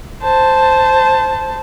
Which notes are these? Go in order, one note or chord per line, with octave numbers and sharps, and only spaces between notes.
C5 A5